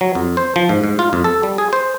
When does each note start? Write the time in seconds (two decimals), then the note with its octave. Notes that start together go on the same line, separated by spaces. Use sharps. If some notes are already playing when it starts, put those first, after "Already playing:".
0.01 F#3
0.15 F2
0.37 C5
0.56 F3
0.69 G#2
0.84 G#2
0.99 F4
1.13 F2
1.24 A4
1.43 G3
1.58 G#4
1.73 C5